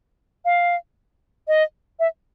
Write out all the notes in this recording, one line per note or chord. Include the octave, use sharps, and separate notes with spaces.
F5
D#5
E5